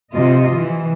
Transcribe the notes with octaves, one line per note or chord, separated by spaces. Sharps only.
C3 F4 D#5
E3